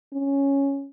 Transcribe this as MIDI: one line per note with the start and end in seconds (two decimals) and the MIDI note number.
0.13 0.89 61